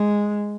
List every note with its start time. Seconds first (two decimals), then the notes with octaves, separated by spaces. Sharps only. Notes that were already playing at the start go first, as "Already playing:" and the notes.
Already playing: G#3